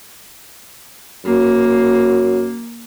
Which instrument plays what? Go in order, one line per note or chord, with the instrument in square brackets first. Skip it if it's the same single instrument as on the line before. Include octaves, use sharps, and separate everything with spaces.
[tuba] F#2 [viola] A#3